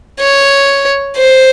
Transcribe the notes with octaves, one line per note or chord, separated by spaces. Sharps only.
C#5
C5